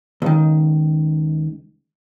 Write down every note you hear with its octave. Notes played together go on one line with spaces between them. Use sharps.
C#2 D#3